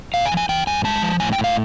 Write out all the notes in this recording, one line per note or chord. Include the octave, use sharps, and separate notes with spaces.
A#2 F5
G#5
F3
G#5
E3 G5
G2 G#5
G#3 A5
F3
A2 G#5
G5
A2
F5